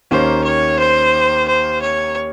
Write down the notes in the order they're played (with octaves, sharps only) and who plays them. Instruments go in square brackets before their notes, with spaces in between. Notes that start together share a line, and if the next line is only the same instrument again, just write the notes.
[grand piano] D#2 D#3 A#3 C#4 [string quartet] C5
[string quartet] C#5
C5
C5
C#5